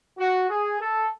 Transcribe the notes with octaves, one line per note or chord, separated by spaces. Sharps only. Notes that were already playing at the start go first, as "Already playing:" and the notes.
F#4
G#4
A4